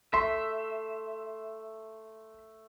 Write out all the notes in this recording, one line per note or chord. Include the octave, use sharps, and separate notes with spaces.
A3 E5 C6